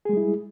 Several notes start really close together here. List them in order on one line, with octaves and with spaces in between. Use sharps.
G#4 G#3 G3 E4